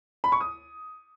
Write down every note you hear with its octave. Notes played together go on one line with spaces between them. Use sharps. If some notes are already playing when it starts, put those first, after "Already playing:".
B5
C#6
D#6